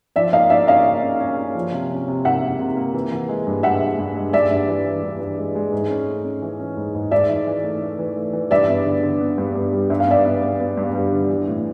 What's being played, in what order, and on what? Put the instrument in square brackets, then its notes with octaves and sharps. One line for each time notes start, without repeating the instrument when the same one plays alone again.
[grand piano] F3 [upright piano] D5 E5
[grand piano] A#3 [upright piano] D#5 F5
[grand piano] A#3 [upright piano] D5 E5
[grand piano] C#4 [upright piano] D#5 F5
[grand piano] A#3
C#4
C#4
C#4
F3
C3
C#4
C3
[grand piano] A#3 [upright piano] E5 F#5
[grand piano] A#3
C3
A#3
E3
E3
G#3
G2
[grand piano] G#3 [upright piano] E5 F#5
[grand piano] G2
G2
G#3
[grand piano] G2 [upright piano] D5 E5
[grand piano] G2
E3
E3
G2
E3
G#3
G#3
G#2
C#4
A3
C#4
E3
C#4
G#2
G#2
[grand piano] G#2 [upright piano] D5 E5
[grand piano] E3
E3
A3
A3
E3
A3
E3
[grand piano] G2 [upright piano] D5 E5
[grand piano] B3
D3
D3
B3
G2
G2
G3
[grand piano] G2 [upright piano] E5
[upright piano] F5
[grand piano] B3 [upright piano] D5 E5
[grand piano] B3
B3
B3
G2
G3
D3
E3
A2